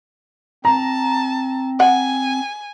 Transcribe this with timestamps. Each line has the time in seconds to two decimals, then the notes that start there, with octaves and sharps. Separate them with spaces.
0.65 C4 A5 A#5
1.80 F#5 G#5